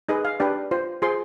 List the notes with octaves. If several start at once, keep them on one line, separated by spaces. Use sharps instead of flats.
D#4 G#4 B4 D#5
F5
D4 G4 B4 D5
F4 C5
F4 G#4 C5 C6